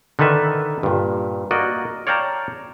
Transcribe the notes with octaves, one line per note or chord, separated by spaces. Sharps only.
D3 D#3 A4 B4 E5
G2 A#2
A#3 F#4 D5 D#5
C#5 D5 F5 G5 A5 A#5